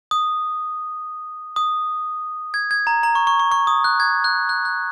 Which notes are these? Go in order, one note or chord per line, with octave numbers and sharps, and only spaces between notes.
D#6
D#6
G#6
G#6
A#5
A#5
C#6
C#6
C#6
C#6
D#6
F#6
G#6
F#6
F#6
F#6